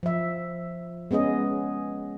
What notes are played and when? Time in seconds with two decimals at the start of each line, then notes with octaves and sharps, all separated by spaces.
0.03 F3 E5
1.11 G#3 B3 C#4 G#4 D#5